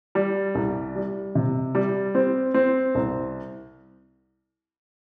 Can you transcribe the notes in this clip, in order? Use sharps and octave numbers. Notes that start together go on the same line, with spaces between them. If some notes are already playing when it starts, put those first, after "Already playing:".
G3
C2
G3
C3
G3
C4
C4
C2